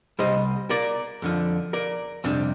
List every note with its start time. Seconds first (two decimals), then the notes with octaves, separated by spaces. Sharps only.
0.19 C2 C3 G3 C5 D#5
0.70 A#4 D5
1.22 F2 D3 F3
1.73 A#4 D5
2.24 F2 C3 G3 D4